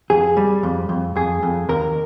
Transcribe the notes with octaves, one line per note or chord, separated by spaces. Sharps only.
F2 G#4
G3
F2
F2
F2 G#4
F2
D#2 A#4